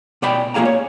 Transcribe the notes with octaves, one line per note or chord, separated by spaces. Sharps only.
B2 D5 G5 B5
A#3 F4 G#4 F5 A#5
C#5